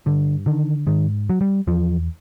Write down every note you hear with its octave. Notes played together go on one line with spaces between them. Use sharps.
G2 D3
D3 D#3
G#2 D#3
F#3
G3
E2 F3